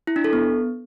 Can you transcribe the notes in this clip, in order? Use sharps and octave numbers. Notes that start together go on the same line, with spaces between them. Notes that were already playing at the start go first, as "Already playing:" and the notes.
E4
D4
A4
B3